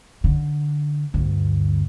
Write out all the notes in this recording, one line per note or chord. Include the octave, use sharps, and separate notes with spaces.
D3
D2 G2